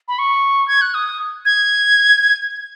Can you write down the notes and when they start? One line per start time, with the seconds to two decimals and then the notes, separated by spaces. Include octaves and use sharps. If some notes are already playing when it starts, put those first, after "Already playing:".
0.08 B5
0.19 C#6
0.68 G#6
0.82 F#6
0.94 D#6
1.45 G#6